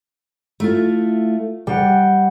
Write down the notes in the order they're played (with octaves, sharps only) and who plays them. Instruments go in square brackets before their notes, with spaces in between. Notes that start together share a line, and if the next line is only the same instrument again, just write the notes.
[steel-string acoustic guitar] A3 E4 F4
[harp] G3 F#5 [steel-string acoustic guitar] G5